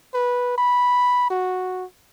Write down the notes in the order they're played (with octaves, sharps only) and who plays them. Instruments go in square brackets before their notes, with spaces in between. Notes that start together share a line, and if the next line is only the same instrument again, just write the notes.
[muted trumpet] B4
B5
F#4